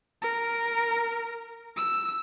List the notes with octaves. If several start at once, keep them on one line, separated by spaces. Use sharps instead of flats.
A#4
E6